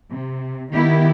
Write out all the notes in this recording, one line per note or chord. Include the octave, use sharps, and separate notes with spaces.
C3
D#3 B3 E4 G4